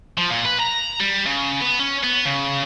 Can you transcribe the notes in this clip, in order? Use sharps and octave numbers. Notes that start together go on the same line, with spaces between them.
F3
A#2
B4
A#5
G3
C#3
B3
C#4
B3
C#3